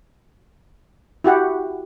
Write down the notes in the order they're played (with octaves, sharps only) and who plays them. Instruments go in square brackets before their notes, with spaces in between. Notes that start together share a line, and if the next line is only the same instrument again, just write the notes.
[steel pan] E4 F#4 G4 F#5